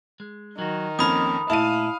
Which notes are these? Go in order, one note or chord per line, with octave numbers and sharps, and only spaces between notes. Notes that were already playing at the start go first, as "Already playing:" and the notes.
G#3
D#3 F#3 F#4
F2 A#3 C#4 D#4 B5 D#6
A#2 A3 E4 F5 A5 D#7